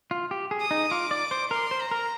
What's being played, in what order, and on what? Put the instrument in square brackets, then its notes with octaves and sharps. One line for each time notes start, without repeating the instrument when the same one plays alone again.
[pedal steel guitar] F4
G4
G#4
[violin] D#6
[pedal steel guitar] D#4
[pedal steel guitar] F4 [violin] D6
[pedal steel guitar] D5
C5
[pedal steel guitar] A#4 [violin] C6
[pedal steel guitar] C5
[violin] A#5
[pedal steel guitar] A#4